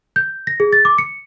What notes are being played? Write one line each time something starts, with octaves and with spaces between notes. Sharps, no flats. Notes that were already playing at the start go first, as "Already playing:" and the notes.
G6
A#6
G#4
A6
D6
C#7